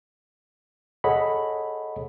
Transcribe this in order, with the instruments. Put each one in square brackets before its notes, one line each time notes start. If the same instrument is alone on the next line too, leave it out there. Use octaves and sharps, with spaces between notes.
[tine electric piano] G#4 A4 C#5 D#5 F#5 B5